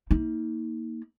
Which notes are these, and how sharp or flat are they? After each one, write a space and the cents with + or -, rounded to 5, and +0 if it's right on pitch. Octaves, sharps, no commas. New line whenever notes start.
A#3 +0 D#4 +35